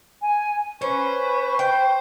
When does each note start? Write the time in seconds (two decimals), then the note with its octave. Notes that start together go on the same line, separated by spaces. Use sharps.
0.22 G#5
0.81 C#4 B4 C5 C#6
1.59 G5